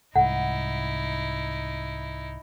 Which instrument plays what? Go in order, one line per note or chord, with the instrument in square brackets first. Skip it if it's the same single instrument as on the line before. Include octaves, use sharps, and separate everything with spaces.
[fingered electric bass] C2 G#2 [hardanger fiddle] D#4 E4 [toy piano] F#5